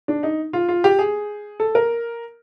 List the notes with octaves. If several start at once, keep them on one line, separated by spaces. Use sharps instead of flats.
D4
D#4
F4
F4
G4
G#4
A4
A#4